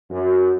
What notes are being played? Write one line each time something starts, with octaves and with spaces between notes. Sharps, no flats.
F#2